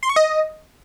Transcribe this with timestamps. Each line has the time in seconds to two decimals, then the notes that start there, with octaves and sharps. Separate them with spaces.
0.03 C6
0.09 C#6
0.16 D#5